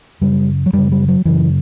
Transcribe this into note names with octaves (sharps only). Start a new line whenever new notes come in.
F#2 C#3 G3
F#3
F#2 C#3 G3
G3
F#3
F#2 C#3 E3